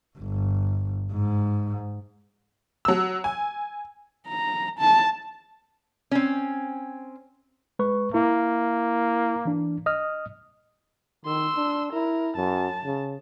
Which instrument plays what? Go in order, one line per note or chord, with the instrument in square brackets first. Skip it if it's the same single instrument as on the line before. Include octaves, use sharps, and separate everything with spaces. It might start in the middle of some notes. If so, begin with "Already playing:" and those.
[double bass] G1
G#2
[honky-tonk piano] F#3 E6
G#5
[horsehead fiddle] A#5
A5
[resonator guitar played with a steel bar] C4 C#4
[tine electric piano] G#3 B4 C#6
[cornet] A#3 [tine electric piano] E4
[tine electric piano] E3 D4
D#5 D#6 F6
[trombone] D#3 [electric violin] C6 E6
[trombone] D4
[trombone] E4 [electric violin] A#4
[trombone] F#2 [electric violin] A5
[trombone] C#3